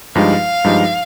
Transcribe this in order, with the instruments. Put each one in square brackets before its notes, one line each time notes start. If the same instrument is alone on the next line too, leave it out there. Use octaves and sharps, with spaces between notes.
[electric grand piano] G2 F3 G#3 D#4 G4 [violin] F5
[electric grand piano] G2 F3 G#3 D#4 G4